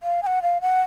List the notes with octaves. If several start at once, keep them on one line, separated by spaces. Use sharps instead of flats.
F5
G#5
F#5
F5
F#5